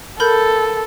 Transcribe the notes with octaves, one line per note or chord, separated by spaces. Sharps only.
A4 A#4 B5 G6